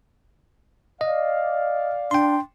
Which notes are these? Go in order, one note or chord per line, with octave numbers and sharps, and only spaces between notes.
D5 D#5 F5
D4 G5 C6